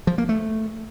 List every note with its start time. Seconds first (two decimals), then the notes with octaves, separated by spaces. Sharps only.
0.07 F3
0.18 A#3
0.29 A3